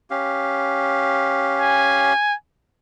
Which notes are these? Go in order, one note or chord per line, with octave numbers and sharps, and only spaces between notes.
C#4 G4 F5
G#5